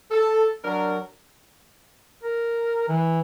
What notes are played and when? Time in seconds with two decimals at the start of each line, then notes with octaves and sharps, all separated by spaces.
0.11 A4
0.64 F#3 D4 A#4
2.23 A#4
2.89 E3